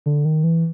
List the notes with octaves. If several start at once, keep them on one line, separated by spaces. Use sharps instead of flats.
D3
D#3
E3